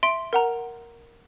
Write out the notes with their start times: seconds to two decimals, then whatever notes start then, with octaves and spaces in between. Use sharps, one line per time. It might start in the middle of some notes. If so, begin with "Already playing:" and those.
0.03 E5 C6 D7
0.33 A#4 F#5 A#5